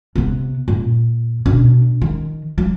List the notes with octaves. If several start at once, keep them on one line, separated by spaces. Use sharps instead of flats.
C3 B3
A#2
B2 D4
D#3
F#3